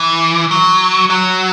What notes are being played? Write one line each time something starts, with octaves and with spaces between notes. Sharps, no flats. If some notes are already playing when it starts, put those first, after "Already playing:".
Already playing: E3
F#3
F#3